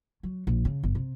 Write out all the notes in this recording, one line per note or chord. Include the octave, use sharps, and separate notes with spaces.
F#3
A#1
C#3
G1
C3